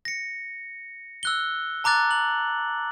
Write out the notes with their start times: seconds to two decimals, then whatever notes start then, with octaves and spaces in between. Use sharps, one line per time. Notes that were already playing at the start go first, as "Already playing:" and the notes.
0.05 A#6 C#7
1.23 E6 F#6 G7
1.84 A5 A#5 D6 F#6 A6
2.11 F#7